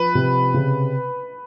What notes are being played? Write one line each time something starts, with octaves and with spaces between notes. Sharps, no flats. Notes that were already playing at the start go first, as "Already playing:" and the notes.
Already playing: F3 B4
C3
C#3